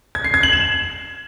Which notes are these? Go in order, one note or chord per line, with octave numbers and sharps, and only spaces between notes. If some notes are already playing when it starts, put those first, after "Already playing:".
G#6
C7
G#6
F#7
E7